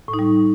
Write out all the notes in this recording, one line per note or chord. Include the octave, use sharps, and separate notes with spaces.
A2
D#4
G3